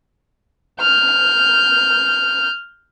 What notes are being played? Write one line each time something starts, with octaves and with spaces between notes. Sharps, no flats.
F6 G6